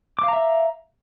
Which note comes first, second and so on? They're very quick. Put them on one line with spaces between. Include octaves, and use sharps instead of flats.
D6 F5 A#5 E5